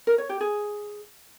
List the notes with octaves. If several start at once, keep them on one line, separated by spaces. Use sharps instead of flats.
A#4
C#5
G4
G#4